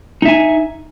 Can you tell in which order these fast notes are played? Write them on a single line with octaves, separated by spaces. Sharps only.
D#4 E5 G#5